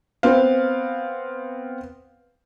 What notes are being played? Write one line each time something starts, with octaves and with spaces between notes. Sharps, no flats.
B3 C4 F5